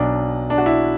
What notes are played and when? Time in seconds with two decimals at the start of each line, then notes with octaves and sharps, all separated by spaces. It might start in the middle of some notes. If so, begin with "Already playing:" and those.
Already playing: B1 B2 D4
0.50 D4
0.58 F#4
0.66 E4